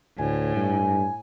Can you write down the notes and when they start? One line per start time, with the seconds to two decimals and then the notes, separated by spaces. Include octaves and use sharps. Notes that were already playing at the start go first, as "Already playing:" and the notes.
0.19 D2 A2 G#5
0.56 G2